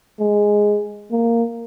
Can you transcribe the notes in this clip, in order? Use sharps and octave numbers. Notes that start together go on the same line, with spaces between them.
G#3
A#3